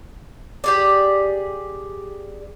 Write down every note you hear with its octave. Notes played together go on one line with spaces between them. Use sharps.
G4 G#4 D5